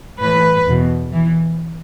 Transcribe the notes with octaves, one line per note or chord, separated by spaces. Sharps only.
A2 E3 B4
E2 B2
E3